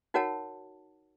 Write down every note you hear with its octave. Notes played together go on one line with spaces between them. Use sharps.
D#4 F#4 A#4 C#5 F#5 A5